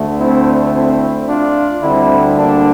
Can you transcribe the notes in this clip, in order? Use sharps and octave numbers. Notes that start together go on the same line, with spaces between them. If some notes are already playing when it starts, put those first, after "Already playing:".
Already playing: D2 D3 A3
C4 E4
C4 E4
D4 F4
D2 D3 G3 C4 E4
A#3 D4